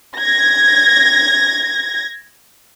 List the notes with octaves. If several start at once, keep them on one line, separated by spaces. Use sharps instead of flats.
G#6 A#6